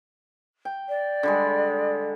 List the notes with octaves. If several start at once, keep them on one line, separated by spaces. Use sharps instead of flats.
G5
D5
D3 G3 G#3